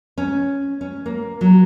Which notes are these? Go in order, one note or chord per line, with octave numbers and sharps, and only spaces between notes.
C#4
C#4
A#3
F#3